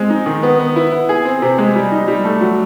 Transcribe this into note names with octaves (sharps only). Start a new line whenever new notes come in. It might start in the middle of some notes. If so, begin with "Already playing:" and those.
Already playing: G#3 C4
D#4
D#3
B3
B3
E4
B3
G#4
C4
C3
G#3
G3
D#4
G3
A3
F#3